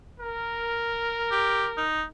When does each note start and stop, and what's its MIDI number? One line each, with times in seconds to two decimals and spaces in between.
0.20 1.86 70
1.31 1.66 67
1.77 2.04 63